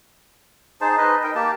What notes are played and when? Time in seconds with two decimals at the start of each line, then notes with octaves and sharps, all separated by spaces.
0.81 D#4 G#4 C5 A5
0.98 D#4 B4 D#5
1.24 D#4 A#4 G5
1.35 A#3 G4 A5